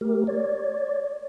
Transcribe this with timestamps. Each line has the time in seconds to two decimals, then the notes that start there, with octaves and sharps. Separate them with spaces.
0.01 A3 G4 A#4
0.27 C#5 D5